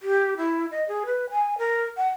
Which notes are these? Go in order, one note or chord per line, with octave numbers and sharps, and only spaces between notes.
G4
E4
D#5
G#4
B4
G#5
A#4
F#5